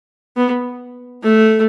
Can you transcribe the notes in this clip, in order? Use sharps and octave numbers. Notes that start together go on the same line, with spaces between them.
B3
A3